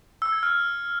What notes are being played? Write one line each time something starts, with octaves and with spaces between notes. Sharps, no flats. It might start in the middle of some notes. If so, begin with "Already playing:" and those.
E6
G#6
F6